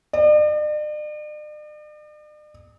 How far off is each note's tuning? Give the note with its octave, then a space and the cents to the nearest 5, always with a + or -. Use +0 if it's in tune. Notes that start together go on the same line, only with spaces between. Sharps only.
D5 +45